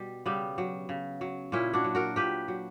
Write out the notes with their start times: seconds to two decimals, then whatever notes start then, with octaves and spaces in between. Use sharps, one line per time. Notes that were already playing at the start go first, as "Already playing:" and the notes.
Already playing: B2 G3
0.26 C#3 G3 B3
0.58 F#3
0.89 C#3
1.21 F#3
1.52 A#2 C#4 E4
1.74 D4 F#4
1.84 F#3
1.95 F#4 A#4
2.16 A#2 G4 B4
2.48 F#3